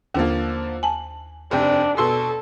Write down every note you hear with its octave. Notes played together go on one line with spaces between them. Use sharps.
D#2 D3 F3 A#3
G#5 A5 F#7
F1 C3 D4 G4
B2 A4 C6 E6